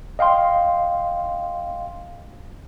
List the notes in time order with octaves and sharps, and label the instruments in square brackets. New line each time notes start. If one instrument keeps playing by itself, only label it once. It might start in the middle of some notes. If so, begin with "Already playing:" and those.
[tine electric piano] D#5 F5 G5 C6